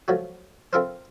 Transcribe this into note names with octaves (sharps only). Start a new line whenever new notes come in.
F3 F#3 A3 F#4
C4 E4 F4 A4 A#4 C5